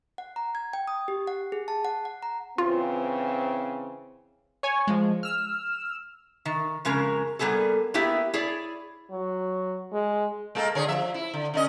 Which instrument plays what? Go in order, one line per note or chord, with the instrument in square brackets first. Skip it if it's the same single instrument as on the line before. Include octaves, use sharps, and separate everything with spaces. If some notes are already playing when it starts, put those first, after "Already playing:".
[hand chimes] F#5
A#5
G#6
G5
D#6
G4
F#5
G#4
A5
F#5
F#5
A#5
[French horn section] C#3 E3 C4 [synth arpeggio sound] F4
[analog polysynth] C#5 G#5
F3 G#3
E6 F6
[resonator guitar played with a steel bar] D#3
F2 C#3 G#3 A#4 A#5
G3 A#3 B3 G#4 A4
A#3 B3 E4 G4 G#4
E4 G#4 C#5 D5
[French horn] F#3
G#3
[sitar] G#3 A#3 A4
D3 G#4 C#5
F3 E5
E4
D3
D3 C#4 D#5